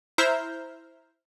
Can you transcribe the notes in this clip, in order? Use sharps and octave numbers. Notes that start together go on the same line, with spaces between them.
E4 C5 E5 A#5 F6 G6